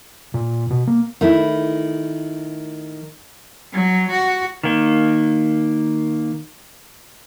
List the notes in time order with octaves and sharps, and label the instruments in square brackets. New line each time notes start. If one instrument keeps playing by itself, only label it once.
[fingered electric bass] A#2
B2
A#3
[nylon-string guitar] D#3 A3 E4
[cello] F#3
F#4
[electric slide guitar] D#3 A#3